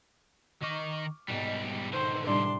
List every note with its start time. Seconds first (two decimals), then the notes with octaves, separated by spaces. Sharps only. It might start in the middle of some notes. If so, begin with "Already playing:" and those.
0.63 D#3 D#5 C#6 D6 F6
1.29 B1 G#2 B2 G3
1.93 D3 D#3 C5
2.26 A2 C3 G3 D4 C6